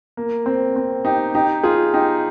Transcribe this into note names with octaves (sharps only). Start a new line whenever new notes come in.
A#3
C4
C4
D#4 G4
D#4 G4
F4 G#4
D#4 G4